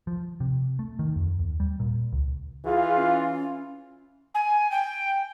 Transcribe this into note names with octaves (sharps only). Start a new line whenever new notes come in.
F3
C3
A3
D#3
F2
D#2
G3
A#2
C#2
E3 F4 G#4
C#4
G#5
G5